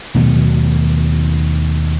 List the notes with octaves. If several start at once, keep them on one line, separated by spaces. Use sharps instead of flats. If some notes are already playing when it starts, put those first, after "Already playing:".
D#2 B2 F#3 A3